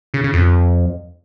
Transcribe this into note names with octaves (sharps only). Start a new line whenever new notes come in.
C#3
C#3
F2